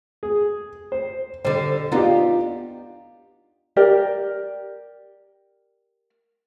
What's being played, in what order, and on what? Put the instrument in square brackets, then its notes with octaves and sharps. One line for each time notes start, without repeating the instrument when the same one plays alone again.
[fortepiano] G#4
C5
[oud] D3 G3 [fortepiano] C5
[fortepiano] B3 G4 [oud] D4 D#4 F4
[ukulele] G4 A#4 D5